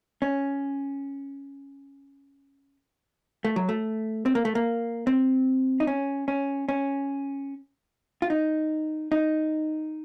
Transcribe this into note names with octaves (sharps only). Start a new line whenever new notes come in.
C#4
A3
F#3
A3
C4
A#3
A3
A#3
C4
D#4
C#4
C#4
C#4
F4
D#4
D#4